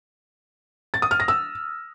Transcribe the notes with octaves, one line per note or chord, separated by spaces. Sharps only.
A6
D#6
F6
A#6
E6